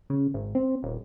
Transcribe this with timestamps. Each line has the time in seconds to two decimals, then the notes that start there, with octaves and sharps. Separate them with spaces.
0.10 C#3
0.34 G#1
0.55 C4
0.83 D#1